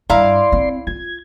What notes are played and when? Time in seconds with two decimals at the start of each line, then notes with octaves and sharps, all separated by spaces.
0.10 G2 E4 D5 F5 A#5 C6
0.52 C4
0.87 F4 G#6